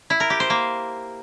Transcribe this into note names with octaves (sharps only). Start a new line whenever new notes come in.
E4
A#4
G4
C5
A#3